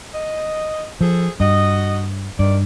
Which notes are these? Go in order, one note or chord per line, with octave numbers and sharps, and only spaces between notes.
D#5
F3 G#4 A4 C5
G2 F#4 D#5
G2 D#3 D5